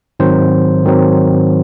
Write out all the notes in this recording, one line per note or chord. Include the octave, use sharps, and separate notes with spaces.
G#2 D#3 F#3 C4 C5
G#2 D#3 F#3 C4